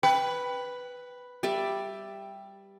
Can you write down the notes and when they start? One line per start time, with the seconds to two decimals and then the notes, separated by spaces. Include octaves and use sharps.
0.03 B4 G5
1.43 G3 D5 E5